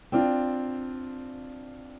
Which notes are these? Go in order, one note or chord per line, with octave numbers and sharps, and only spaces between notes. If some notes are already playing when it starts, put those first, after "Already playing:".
C4 D4 F4